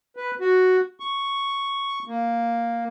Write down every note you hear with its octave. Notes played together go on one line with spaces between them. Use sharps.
B4
F#4
C#6
A#3